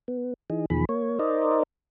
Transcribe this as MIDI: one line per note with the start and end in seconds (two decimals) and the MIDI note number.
0.08 0.34 59
0.50 0.65 52
0.50 0.65 63
0.50 0.65 68
0.70 0.85 40
0.70 0.85 47
0.70 0.85 51
0.70 0.85 53
0.70 0.85 68
0.70 0.85 83
0.89 1.19 58
0.89 1.19 73
1.19 1.63 63
1.19 1.63 70
1.19 1.63 72
1.19 1.63 74
1.19 1.63 75